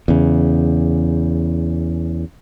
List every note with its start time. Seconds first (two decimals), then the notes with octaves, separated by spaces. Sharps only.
0.08 E2 C#3